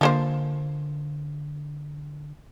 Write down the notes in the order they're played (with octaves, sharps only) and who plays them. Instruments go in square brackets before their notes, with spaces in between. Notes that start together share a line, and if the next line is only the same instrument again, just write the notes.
[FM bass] D3 [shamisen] F3 A#3 C5